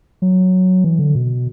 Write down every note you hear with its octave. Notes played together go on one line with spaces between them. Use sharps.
F#3
E3
D3
B2